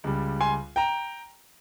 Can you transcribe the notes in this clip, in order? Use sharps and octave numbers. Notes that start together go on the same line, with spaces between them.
C#2 C#3 G3
G#5 C6
G5 A#5